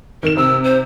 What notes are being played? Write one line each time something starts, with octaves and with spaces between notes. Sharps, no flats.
D#3 A#4 E7
C3 E6
C5